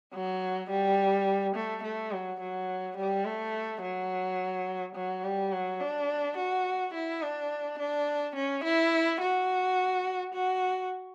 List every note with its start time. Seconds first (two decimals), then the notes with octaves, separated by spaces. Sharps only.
0.13 F#3
0.70 G3
1.55 A3
1.83 A3
2.12 F#3
2.40 F#3
2.97 G3
3.25 A3
3.82 F#3
4.96 F#3
5.24 G3
5.52 F#3
5.80 D4
6.37 F#4
6.94 E4
7.22 D4
7.79 D4
8.35 C#4
8.64 E4
9.21 F#4
10.34 F#4